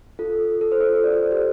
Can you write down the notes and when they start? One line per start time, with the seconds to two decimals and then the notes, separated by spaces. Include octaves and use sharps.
0.19 F4 A4
0.61 A4
0.72 C5
0.81 F4 A4
1.04 D5
1.12 C5
1.22 A4
1.31 G4 C5